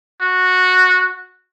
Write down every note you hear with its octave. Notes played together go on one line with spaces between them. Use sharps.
F#4